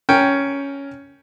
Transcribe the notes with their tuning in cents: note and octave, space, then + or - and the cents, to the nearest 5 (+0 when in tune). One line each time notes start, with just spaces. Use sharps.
C#4 +5 A#4 +0 G5 +0